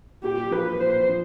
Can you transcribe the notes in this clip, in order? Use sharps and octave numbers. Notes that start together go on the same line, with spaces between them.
A#2 G4
F3 A#3 B4
A#2 C5
F3